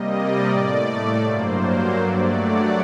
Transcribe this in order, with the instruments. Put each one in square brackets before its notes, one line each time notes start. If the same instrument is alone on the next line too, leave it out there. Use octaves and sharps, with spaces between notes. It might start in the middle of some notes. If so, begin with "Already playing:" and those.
Already playing: [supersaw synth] C3 G3 A#3 D#5
D5
A2 A3
G2 F#3 A#3 C5
C5
G2 F#3 A3 D5
F#5